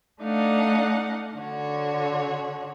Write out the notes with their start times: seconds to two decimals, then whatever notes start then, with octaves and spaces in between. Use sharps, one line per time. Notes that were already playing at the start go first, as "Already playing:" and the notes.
0.21 A3 D4 D#4 F5 F#5
1.36 D3 F#4 C#5